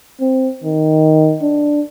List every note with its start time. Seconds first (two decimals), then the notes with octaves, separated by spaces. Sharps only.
0.21 C4
0.63 D#3
1.42 D4